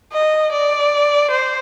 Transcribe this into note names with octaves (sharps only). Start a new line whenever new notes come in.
D#5
D5
C5